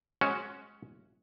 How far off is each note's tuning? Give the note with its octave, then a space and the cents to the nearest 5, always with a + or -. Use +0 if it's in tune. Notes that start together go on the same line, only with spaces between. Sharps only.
G#3 +20 C#4 +0 F#4 +0